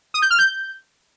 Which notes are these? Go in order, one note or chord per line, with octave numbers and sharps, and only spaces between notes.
D#6
G6
F6
G6